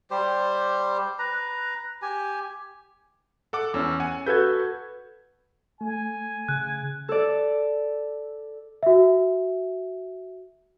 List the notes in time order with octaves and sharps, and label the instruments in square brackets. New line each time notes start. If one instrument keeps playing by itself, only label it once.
[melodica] G3 G4 C5
B4 A#5
G4 G#5
[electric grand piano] A4 F#5 D6
[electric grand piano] E2 [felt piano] C#4 E6
[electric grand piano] F#5 G#5
[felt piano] F#4 A4 B4 [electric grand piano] G6 G#6
[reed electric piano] A3 [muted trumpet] G#5
[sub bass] C#3 [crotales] F#6
[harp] A4 D5
[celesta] F#4 E5